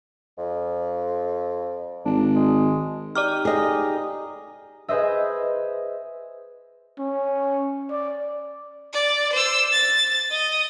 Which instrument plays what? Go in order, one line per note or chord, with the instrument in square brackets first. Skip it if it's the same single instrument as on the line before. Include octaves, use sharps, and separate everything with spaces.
[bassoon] F2
[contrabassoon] G#1 [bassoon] D4
[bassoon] G#3
[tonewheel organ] D#4 G4 [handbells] D5 D6 F6
[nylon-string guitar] G#4 D#5
[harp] G#4 B4 C5 D#5 E5
[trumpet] C#4
D5
[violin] D5
C5 E6
A6
D#5